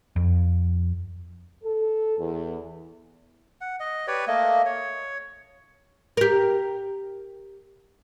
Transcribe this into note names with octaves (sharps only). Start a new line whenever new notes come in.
F2
A4
E2
F#5
D#5
G4 B4 C#5 D5
A3 A#3 D#5
C#5
G4 A#4